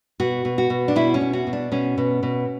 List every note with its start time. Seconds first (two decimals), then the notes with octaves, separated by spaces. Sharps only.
0.20 B2 F#4
0.45 B2
0.58 F#4
0.70 B2
0.88 D4
0.96 B2 E4
1.14 C#4
1.21 B2
1.33 F#4
1.47 B2
1.53 D4
1.72 B2 C#4
1.98 B2
2.23 B2